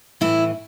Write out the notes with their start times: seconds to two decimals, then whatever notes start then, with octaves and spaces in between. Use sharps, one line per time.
0.21 A2 E3 E4